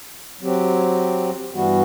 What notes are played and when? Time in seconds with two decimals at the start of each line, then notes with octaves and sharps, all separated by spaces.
0.41 F#3 C4 G4
1.53 G2 E3 G3 B3 F#4